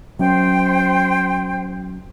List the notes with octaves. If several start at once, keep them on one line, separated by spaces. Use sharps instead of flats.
F#3 C#4 C5 G5